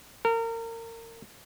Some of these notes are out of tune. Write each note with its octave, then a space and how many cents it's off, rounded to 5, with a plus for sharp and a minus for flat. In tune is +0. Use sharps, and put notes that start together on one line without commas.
A#4 -30